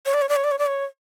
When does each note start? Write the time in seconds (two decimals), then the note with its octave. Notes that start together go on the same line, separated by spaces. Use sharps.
0.06 C#5
0.14 D5
0.22 C#5
0.29 D5
0.36 C#5
0.44 D5
0.51 C#5
0.59 D5
0.66 C#5